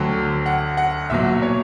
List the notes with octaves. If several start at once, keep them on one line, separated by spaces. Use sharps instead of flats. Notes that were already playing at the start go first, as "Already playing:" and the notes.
Already playing: D2 D3 F#3 G5
F#5
F#5
B1 A#2 F#3 E5
C#5